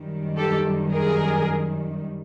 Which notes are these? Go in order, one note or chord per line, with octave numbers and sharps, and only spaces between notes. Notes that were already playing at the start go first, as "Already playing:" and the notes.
Already playing: F#2 D#3 G3
G4 A4
G#4 A#4